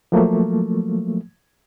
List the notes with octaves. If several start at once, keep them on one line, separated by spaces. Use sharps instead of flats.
F3 F#3 A3 A#3